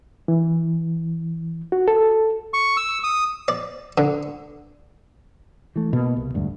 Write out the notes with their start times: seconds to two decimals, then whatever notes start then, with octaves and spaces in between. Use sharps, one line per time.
0.28 E3
1.72 F#4
1.88 A4
2.54 C#6
2.77 E6
3.04 D#6
3.48 D5
3.98 D3
5.76 E3 A3
5.93 B2 A#3
6.17 C2
6.34 E1 D2 G2